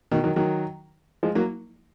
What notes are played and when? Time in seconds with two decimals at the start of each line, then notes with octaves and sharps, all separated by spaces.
0.12 B2 D#3
0.24 D#3 F#3
0.36 D#3 F#3
1.23 F3 G#3
1.35 F#3 A#3